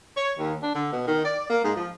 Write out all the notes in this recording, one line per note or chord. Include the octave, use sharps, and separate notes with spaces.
C#5
D#2
D4
D3
B2
D#3
D5
A#3
G#2
F3